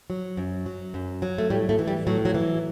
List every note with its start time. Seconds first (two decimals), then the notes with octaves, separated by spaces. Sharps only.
0.10 F#3
0.37 F#2
0.66 F#3
0.94 F#2
1.22 F#3
1.38 A3
1.50 A2 G3
1.69 A2 A3
1.79 E3
1.88 G3
2.07 A2 F#3
2.25 F#3
2.34 E3